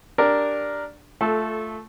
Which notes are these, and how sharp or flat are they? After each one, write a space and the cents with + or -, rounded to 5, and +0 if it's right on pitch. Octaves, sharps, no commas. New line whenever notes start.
D4 +0 G4 +0 A#4 +0
A3 +0 F4 +0 A4 -20